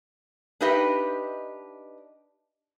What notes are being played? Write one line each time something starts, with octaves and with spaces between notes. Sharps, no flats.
D4 D#4 G4 B4 D#5 E5